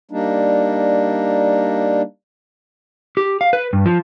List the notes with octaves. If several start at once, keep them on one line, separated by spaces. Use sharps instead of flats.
G3 A#3 D4 D#4
G4
F5
B4
G2
F3